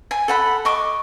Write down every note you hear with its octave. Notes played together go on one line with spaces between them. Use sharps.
G#5
A4 F#5 B5
D#5 C#6 D6